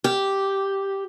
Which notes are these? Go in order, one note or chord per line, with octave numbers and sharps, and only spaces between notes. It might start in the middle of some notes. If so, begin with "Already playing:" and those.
G4